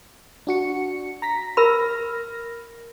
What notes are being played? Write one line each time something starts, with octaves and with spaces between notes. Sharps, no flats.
D4 F#4 C#7
A#5 A#6 B6
A#4 B5 F6 A#6